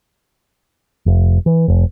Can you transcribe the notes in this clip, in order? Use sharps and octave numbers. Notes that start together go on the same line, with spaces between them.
F1
E3
F1